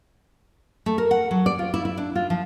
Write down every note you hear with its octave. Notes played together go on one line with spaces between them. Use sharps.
A3
A#4
F#5
F#3
D5
F4
E4
E4
D4
F4
F3